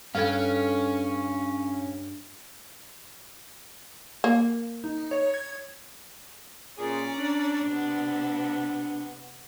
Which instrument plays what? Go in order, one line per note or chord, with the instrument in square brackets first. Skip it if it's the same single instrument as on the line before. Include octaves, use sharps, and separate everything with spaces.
[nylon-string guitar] G2 A4 B4 [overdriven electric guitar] C#4 [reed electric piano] F5 G#6
[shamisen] A#3
[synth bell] D#4
C#5
G#6
[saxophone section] A#2 G#4 [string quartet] C#4 D5 A#5
[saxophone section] D4
[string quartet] C3 B3